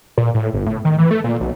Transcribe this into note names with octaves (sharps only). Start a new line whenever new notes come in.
A#2
A2
G1
A2
D#3
E3
A3
A#2
B1